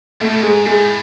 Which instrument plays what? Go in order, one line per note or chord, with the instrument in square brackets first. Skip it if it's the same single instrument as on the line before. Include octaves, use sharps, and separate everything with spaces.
[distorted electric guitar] B2 [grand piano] A3
[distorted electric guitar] A2
B2
[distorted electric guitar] G#2 [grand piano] G#3
[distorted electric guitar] A2 [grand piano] G#3